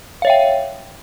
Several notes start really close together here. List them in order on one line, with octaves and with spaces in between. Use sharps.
F5 C#5 E5 G5